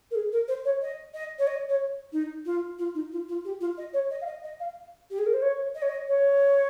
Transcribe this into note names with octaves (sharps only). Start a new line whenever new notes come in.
A#4
G#4
A#4
C5
C#5
D#5
D#5
C#5
D#5
C#5
D#4
F4
F4
D#4
F4
F4
G4
F4
D#5
C#5
D#5
F5
D#5
D#5
F5
G4
G#4
A#4
C5
C#5
D#5
C#5
D#5
C#5